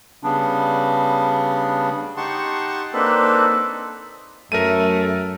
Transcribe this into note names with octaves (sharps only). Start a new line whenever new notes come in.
C#3 G3 B3 D4
D#4 G4 F#5 A5 C6 C#6
A#3 C4 D4 D#4 A4 B4
F#2 A3 A#4 E5 D#7